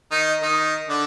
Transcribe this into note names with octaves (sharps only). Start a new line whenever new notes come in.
D#3 D#4
D#3 D#4
D3 D4